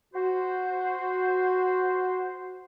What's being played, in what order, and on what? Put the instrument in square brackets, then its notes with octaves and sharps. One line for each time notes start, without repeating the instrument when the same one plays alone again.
[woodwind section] F#4 C5